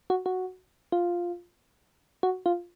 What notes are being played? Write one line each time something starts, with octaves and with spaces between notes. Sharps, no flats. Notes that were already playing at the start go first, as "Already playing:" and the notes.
F#4
F#4
F4
F#4
F4